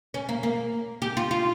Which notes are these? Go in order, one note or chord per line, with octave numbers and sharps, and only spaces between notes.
C#4
A#3
A#3
G4
F4
F4